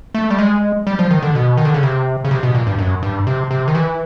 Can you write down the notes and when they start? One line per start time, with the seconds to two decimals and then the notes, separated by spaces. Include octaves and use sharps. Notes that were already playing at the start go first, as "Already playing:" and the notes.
0.14 A3
0.30 G3
0.38 G#3
0.87 G3
0.99 F3
1.11 D#3
1.23 D3
1.35 B2
1.57 D#3
1.65 D3
1.74 C#3
1.83 C3
2.25 C#3
2.31 C3
2.43 B2
2.55 A#2
2.67 G2
2.78 F#2
3.03 G2
3.27 C3
3.51 C3
3.68 D#3
3.75 E3